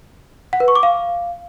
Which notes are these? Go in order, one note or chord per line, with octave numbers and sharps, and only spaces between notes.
F#5
B4
C#6
D6
F5